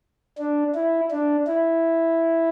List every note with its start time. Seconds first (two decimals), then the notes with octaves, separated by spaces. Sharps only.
0.38 D4
0.75 E4
1.11 D4
1.47 E4